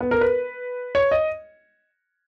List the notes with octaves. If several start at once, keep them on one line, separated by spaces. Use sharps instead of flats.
B3
A#4
B4
C#5
D#5